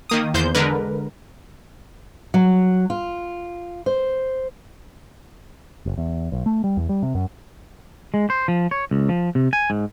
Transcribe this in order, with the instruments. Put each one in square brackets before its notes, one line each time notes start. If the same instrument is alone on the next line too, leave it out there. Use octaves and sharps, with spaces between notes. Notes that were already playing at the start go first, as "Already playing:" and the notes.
[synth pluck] D#3 A#3 D#6
E2 C5 G6
D3 G#3 A#4 B4
[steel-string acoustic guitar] F#3
F4
C5
[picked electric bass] F#1
E2
B1
A3
G3
E2
G3
C3
F#2
[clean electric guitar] G#3
C5
F3
C#5
C#2
F3
C3
G#5
G#2